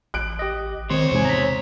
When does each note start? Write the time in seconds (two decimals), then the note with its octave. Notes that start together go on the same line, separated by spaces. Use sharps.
0.14 A1 F#6 D7
0.39 G4 D#5
0.90 C#2 D#3 C4 C#5 C6
1.11 E2 G#2 C3 G#5
1.25 A#5 B6